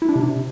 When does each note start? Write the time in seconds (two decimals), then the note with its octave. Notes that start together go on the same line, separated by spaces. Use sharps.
0.02 E4
0.09 D4
0.16 C3